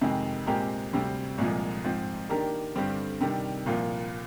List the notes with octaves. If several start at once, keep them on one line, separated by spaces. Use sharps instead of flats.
F2 C3 D#3 G#3
A#2 G#3 C4 G4 A#4
D2 C3 G3 C4
C2 A#2 F3 G#3
G#2 F3 C4
D#3 A#3 D4 G4 A#4
G2 D3 G3 C4 G4
C3 D#3 G3 D4
C2 A#2 F3 A#3 F4